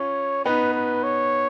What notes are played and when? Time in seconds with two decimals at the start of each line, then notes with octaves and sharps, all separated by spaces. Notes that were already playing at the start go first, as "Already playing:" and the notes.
Already playing: C#4 F4 C#5
0.45 B3 D#4 B4
0.74 B4
1.03 C#5